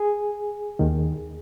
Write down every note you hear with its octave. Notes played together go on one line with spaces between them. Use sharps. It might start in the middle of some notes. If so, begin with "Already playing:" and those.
Already playing: G#4
D#2 D#3